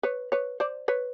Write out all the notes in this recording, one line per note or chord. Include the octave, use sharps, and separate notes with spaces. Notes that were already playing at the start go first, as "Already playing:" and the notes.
B4 C#5
B4 C#5
C5 D5
B4 C#5